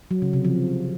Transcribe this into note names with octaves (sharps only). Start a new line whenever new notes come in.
F#3
C#3
C3
F3